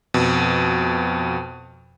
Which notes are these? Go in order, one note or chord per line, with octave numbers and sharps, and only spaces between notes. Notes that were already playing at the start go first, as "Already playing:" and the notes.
F2 B2